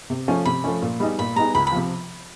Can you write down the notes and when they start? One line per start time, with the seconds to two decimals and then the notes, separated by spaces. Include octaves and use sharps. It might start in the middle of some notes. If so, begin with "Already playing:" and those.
0.10 C3
0.28 F3 A3 C#4
0.45 C3 B5
0.64 F3 A3 C#4
0.82 A#2
1.00 G3 B3 D#4 G#4
1.19 A#2 B5
1.36 G3 B3 D#4 G#4 A#5
1.55 C#2 B5
1.67 B5
1.72 C3 F3